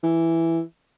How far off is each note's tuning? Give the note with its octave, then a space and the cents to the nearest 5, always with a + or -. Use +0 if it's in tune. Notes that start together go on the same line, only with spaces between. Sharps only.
E3 +5